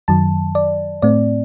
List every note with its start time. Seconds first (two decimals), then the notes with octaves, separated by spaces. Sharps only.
0.08 F#2 D#3 F#3 A5
0.55 D5
1.02 A2 A3 C4 D5